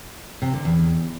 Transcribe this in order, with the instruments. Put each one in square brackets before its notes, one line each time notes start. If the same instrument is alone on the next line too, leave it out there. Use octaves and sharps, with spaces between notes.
[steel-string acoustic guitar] C3
D3
E2